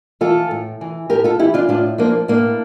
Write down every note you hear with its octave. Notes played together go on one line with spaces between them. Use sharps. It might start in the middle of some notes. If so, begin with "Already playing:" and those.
E3 F4 A4
A2
E3
A2 G4 A#4
F4 A4
E3 E4 G4
D4 F4
A2 D4 F4
F3 A#3 D4
A2 A#3 D4